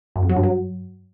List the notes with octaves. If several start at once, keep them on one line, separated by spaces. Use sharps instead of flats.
F#2
F2
F#3
G2
F#3